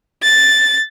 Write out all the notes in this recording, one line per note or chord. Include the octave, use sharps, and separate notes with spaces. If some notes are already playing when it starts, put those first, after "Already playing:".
A6